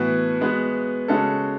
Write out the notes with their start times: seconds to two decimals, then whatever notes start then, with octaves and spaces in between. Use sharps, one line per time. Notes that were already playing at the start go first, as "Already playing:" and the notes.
Already playing: A2 E3 B3 F#4 B4
0.41 G#3 B3 F#4 B4
1.08 C#3 G#3 C#4 F#4 A4